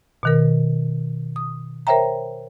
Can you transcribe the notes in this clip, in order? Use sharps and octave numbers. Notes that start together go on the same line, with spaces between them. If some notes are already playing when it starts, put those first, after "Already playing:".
B2 D#3 A#4
D#6
A#4 C5 C#5 E5 G5 A#5